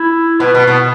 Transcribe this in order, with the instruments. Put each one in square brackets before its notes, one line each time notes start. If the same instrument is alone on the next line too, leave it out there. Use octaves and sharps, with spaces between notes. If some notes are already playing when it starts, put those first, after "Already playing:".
Already playing: [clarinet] E4
[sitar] B2 [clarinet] B4
[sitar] B2
B2